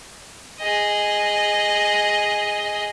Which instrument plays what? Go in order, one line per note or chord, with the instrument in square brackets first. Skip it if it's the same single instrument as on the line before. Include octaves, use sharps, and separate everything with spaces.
[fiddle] G#4 D#5